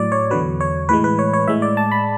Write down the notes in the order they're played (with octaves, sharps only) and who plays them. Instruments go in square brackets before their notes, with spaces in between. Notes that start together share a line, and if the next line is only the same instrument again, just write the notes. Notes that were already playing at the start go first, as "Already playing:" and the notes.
Already playing: [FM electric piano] A2 F#3 D5
C#5
E2 D3 F#3 B4
C#5
A2 E3 G#3 B4
B4
C#5
C#5
A2 G#3 E5
D5
A5
B5